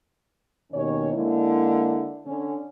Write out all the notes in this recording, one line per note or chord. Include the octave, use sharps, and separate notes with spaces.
D#2 B2 D#3 C#4 C#5
D3 G#3 A#3 E4
D3 C#4